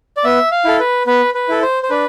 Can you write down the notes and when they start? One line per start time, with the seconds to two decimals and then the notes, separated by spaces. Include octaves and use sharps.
0.17 D5
0.24 B3 E5
0.51 F5
0.65 E4 A4
0.79 B4
1.07 B3 B4
1.34 B4
1.49 E4 A4
1.62 C5
1.83 C5
1.90 D4 B4